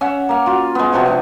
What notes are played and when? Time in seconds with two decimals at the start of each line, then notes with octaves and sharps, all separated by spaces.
0.01 C#4 E5 F#5
0.29 A#3 F5
0.46 F4 F#4
0.75 G#3 B3
0.93 C3 F3 F#4 C#5
1.06 B3 D4